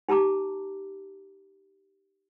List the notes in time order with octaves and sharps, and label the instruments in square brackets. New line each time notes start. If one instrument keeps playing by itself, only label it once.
[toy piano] D#4 G4 A5 A#5 D6